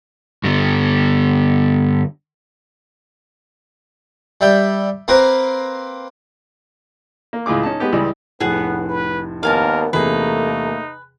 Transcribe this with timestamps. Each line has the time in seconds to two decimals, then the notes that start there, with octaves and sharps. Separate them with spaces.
0.44 G2 D3
4.41 G3 E5 G5
5.08 A#3 C4 A#4 B4
7.33 A#3
7.46 C#2 A2 F4 G#4 D6
7.63 C#4 D#4 A5
7.80 G#3 B3 G4
7.92 C#2 E3 G3 G#3
8.40 F1 A2 B3 G#4 F#5
8.89 B4
9.43 G#1 D#2 B3 A#4 F5 G#5 A5
9.93 E2 C3 A3 A#3 D#4 G#4 B4